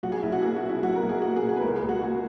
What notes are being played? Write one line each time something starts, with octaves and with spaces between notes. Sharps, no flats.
B1 F#4
G#4
B1 E4
F#4
A#3 G#4
F#4
B2
E4
B1 F#4
A#4
B1
G#4
A#3 F#4
G#4
B2
G#4
B4
C#2 A#4
G#4
C#2
F#4
A#3 F#4